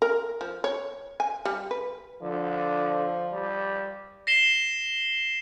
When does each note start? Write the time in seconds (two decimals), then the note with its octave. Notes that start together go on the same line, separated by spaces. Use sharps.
0.02 A#4
0.41 F3
0.64 C#5
1.20 G#5
1.45 G3
1.71 B4
2.22 D3 F3
3.32 G3
4.27 A#6 C7 E7 G7